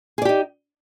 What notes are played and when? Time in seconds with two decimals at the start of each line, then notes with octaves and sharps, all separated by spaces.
0.18 G#4
0.22 D5
0.25 G4
0.29 D#4